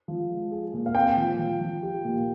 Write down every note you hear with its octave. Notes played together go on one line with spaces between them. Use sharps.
F3
G#3
G#4
A#2
F5
C4 G5
F3
F3
F3
G4
A#2